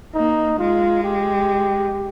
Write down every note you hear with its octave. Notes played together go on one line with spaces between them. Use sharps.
A#3 D#4
G#3 F4
G4